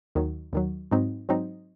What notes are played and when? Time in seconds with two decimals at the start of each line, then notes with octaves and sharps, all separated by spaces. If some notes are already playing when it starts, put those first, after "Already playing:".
0.15 D#2 D#3 F#3
0.53 D#2 D#3 F#3
0.91 G#2 F#3 C4 D#4
1.29 G#2 F#3 C4 D#4